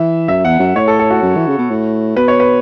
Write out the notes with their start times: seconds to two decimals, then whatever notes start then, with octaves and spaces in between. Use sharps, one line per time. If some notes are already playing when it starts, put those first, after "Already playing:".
Already playing: E3 E5
0.28 F#2 E5
0.45 E2 F#5
0.60 F#2
0.75 A2 C#5
0.88 A4
0.99 A4
1.10 F#4
1.22 F#2
1.37 E3
1.47 C#3
1.59 B2
1.70 A2
2.16 B2 B4
2.28 C#5
2.40 B4